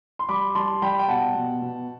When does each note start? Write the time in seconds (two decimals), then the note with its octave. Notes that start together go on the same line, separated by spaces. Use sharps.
0.19 C6
0.29 G3 B5 D6
0.55 G3 A5 C6
0.82 G3 G5 B5
0.99 G5
1.08 B2 F#5 A5
1.35 B2
1.62 B2